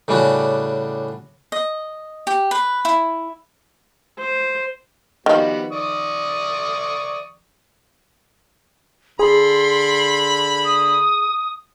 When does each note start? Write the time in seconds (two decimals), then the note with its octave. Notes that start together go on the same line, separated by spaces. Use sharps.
0.08 A2 C#3 G3 C#4 D4 F#4
1.52 D#5
2.27 G4
2.51 B4
2.85 E4
4.19 C5
5.26 D#3 F3 G3 B3 F#4
5.72 D5 C#6 D#6
9.19 D3 G#4 B5 C6
10.65 D#6